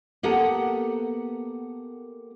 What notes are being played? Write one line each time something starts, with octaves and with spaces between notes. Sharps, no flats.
A#3 B3 G4 A4 F#5 A#5